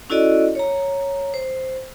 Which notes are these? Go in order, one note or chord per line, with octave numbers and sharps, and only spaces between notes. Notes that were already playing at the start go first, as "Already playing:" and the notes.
C#4 E4 F#4 A4 D5 D#5
C#5 A#5
C5